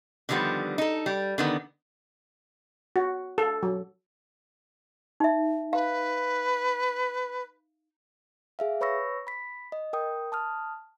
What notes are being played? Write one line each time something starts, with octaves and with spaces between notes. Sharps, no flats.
D3 D#3 F3 G3 B3
D#4 A4
G3
D3 D#3 B3
F#4
A4
F#3
D#4 E5
B4 F5
G#4 E5 F5
B4 C#5 B5 C#6 E6 A#6
B5 B6
D#5
A#4 G5 D#6
A5 D#6 F6